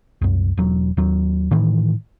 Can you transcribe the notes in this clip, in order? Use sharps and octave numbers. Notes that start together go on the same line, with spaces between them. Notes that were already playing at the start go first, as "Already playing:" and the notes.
C2 F#2
E1 F#3
D#2 F#3
A2 D#3 E3